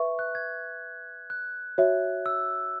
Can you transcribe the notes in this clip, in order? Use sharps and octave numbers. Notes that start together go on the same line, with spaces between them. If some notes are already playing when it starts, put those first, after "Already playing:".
Already playing: B4 E5 C#6
F#6
G#6
F#6
F#4 C#5 E5
E6